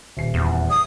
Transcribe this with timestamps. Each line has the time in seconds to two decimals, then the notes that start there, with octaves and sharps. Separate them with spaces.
0.17 D#1 C7
0.34 E2
0.70 D#6